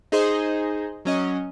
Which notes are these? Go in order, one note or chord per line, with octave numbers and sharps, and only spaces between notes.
D#4 G#4 C5 D#5
F#3 C#4 D#5